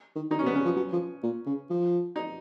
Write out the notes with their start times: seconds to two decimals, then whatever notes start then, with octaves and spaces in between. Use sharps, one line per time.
0.15 D#3
0.30 D#3 D#4
0.39 C#4
0.42 B2
0.46 B3
0.53 C#3 C#4
0.65 F3
0.77 F#3
0.92 F3
1.23 A#2
1.46 C#3
1.70 F3
2.16 D#4